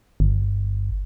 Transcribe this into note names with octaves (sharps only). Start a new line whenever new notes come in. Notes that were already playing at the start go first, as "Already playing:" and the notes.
G1